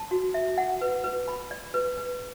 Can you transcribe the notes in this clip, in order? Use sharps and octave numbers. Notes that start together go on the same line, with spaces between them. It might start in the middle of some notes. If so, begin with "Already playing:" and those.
Already playing: A5
F#4
E5
F#5
B4
B4
B5
D5
B4
B4